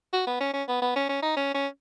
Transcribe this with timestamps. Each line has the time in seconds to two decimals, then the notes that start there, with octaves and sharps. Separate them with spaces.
0.13 F#4
0.27 B3
0.40 C#4
0.53 C#4
0.68 B3
0.82 B3
0.96 C#4
1.09 C#4
1.22 D#4
1.37 C#4
1.54 C#4